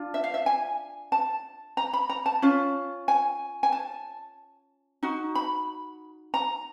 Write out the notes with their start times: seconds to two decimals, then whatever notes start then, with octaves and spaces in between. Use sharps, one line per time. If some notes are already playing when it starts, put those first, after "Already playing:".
Already playing: D4 F4
0.14 E5
0.24 F5
0.34 E5
0.46 G#5
1.12 A5
1.77 A#5
1.93 B5
2.10 A#5
2.26 A5
2.42 C#4 F4
3.08 G#5
3.63 G#5
3.72 A5
5.03 D#4 F#4
5.35 B5
6.34 A#5